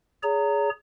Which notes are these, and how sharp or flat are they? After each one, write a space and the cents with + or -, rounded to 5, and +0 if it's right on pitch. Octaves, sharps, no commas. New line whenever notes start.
G#4 +0 C#5 +35 A#5 -20